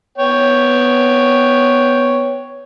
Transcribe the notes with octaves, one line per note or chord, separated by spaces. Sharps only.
B3 C#5 G5